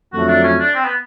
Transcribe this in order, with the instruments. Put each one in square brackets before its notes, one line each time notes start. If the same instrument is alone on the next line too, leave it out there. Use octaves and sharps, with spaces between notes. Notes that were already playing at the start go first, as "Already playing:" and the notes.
[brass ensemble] F2 D3 F#3 A3 [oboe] F#4
[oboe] D4
C#4
D4
C4
B3